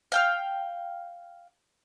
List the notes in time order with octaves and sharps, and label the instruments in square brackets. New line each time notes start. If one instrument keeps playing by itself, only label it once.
[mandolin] F5 G5 F6